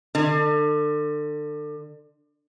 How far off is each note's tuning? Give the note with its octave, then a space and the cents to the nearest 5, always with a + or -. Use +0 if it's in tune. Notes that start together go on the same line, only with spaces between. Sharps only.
D3 +30